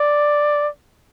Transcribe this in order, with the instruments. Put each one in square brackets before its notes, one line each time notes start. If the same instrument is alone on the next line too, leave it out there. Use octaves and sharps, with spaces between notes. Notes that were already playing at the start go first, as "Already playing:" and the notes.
Already playing: [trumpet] D5